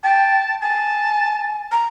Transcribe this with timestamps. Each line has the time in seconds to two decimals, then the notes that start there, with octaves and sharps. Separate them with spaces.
0.04 G5 A5
0.62 G#5 A5
1.72 A#5